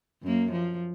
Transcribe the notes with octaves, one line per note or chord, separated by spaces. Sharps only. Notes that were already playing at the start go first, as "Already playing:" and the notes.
F#2 A#3
F3